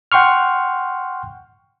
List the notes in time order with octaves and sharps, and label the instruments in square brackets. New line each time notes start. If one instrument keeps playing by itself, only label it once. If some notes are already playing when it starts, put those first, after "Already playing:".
[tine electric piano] F#5 G5 C6 C#6 F6